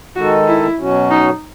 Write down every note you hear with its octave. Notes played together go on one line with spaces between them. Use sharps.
D#3 G#3 D#4 F#4 A4
E4
B2 F#3 C#4 F#4
D#4